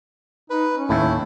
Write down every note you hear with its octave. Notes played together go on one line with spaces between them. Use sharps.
D#4 B4
C#4
D#2 A2 E4